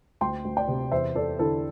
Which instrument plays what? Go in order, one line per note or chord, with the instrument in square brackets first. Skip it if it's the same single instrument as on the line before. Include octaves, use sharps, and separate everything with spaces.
[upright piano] D2 G5 C6
D2
D5 G5
C3
E2 C5 E5
E2 A4 D5
D3 E4 A4